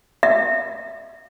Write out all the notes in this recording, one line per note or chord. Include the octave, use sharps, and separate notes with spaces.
E5